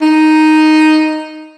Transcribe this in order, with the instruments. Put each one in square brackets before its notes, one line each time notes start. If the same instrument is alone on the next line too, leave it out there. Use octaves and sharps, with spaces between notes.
[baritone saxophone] D#4